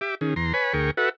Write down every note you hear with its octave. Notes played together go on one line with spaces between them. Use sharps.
G4 E5 D6
D#3 C#4 G#4
E2 A#5 C6
B4 C#5 G#5 B5
D2 G#4 A#4 G5 C#6
F#4 A4 B4 E5 F#5